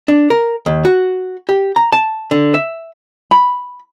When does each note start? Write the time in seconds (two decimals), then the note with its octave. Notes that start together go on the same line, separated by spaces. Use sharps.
0.08 D4
0.30 A#4
0.66 D#2
0.85 F#4
1.49 G4
1.76 A#5
1.92 A5
2.31 D3
2.54 E5
3.31 B5